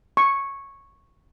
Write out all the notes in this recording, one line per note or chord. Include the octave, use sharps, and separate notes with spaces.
C#6